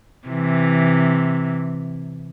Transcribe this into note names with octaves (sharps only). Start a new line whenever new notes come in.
C3 E3